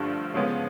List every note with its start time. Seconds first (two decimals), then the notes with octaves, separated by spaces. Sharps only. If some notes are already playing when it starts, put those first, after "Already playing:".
Already playing: G2 D3 F3 A3
0.34 C#3 F3 G#3 B3